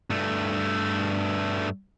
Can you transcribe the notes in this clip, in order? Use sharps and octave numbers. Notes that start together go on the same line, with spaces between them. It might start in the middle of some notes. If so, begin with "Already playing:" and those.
G2 A3